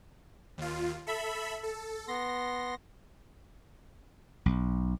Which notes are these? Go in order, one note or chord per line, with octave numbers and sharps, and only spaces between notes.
D#2 F4
A4 E5 B5
A4
B3 C6 A#6
B1